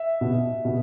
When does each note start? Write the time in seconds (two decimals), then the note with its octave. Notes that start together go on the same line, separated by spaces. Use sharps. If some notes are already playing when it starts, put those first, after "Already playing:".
Already playing: E5
0.21 B2
0.65 B2